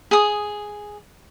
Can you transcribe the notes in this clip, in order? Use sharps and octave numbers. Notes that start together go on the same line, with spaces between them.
G#4 D#6